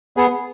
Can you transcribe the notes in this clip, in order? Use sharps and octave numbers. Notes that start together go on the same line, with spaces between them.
B3 G#4